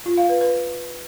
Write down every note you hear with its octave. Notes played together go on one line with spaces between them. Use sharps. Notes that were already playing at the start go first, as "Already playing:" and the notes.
F4
F5
B4
B4